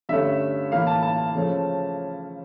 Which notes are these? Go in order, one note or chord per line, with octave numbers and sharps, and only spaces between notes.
G2 D3 A3 C#4 E5
A2 E3 A#3 F5
A5
A5
C#3 F3 A3 C#4